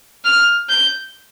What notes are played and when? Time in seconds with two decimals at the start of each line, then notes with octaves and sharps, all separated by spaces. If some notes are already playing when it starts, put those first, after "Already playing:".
0.25 F6
0.69 G6